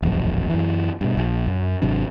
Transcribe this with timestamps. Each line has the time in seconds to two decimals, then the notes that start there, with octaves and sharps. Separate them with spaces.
0.02 D#1 A1 F2 F#3
0.50 F#2 E3
1.01 G2 B2
1.14 D1 A#1
1.47 F#2
1.82 G#1 C3 F#3 D4